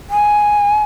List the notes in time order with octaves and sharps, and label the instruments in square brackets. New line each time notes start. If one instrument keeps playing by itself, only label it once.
[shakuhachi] G#5